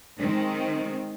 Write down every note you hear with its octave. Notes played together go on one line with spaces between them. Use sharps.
D#3 G#3 C4